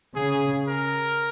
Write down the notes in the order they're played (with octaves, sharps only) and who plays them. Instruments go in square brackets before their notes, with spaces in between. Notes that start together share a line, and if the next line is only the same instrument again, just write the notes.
[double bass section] C#3 [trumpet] G#4
[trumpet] A#4